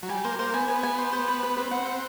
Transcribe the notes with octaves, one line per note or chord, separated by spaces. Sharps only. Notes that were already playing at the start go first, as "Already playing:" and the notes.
F#3
G3 G#5
A#3 C5
A#3 C5
B3 G#5
B3 G#5
G#5
C5
C5
B4
B4
C4 B4
C4 F#5
F#5